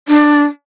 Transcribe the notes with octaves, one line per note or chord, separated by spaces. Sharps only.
D4